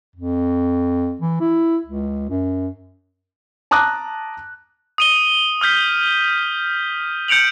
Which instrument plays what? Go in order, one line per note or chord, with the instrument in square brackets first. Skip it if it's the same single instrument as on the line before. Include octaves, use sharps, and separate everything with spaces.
[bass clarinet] F2
E3
E4
C#2
F#2
[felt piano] A5 A#5 D6 D#6 F#6
[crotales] D#6 D#7 G7
D#6 F6 G6 B6
G6 C#7 D7 F7 F#7